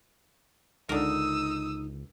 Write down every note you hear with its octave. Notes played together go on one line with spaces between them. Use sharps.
C#2 D3 D#4 A#4 D#6 E6